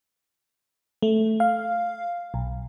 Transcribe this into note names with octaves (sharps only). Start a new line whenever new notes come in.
A3
F5
B1